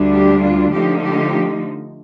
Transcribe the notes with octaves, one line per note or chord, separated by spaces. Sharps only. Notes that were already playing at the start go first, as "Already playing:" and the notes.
Already playing: D2 D3 G3 D4
G4
F4
D3 F3 A3 D#4 G4
G4